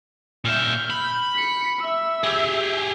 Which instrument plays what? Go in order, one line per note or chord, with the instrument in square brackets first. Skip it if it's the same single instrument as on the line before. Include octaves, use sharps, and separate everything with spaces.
[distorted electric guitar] A#2 E5 [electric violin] F6 G6
[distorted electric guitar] B5
[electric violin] B6 C#7
E5 E6
[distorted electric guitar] G4 G#4